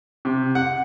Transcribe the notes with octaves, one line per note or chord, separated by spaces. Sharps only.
C3
F#5